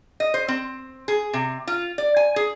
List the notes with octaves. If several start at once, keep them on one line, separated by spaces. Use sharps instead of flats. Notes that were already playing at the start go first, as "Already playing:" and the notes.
D#5
C5
C4
G#4
C3
F4
D5
G#5
G#4